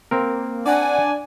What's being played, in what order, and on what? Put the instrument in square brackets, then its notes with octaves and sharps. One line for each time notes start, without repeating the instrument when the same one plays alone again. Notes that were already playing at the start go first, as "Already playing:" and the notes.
[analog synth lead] A#3 [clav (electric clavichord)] C4 A#4
[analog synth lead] D4 [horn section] D5 G#5 [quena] F#5